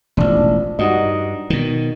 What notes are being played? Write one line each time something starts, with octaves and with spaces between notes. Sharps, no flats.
E1 A1 F3 D4
G2 D#4 F#4 D#5
B2 D#3